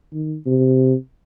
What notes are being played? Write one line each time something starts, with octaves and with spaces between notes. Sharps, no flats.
D#3
C3